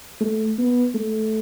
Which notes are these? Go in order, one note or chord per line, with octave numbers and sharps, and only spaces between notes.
A3
B3
A3